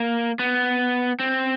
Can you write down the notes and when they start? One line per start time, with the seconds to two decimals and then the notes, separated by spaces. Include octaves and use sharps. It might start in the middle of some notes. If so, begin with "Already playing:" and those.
Already playing: A#3
0.39 B3
1.20 C4